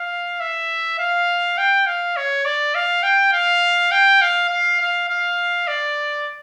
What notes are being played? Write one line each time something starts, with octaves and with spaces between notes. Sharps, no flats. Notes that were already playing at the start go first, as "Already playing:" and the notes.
Already playing: F5
E5
F5
G5
F5
C#5
D5
F5
G5
F5
G5
F5
F5
F5
F5
D5